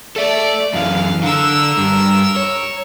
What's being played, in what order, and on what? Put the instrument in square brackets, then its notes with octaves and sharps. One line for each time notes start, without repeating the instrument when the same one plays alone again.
[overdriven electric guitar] A4 E5 [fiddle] D5
[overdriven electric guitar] F#2 E3 [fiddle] F5
[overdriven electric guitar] D3 [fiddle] A#4 E6
[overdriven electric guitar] G2
C#5